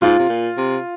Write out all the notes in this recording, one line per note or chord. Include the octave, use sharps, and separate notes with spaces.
G#2 F4
C3
A#2
C3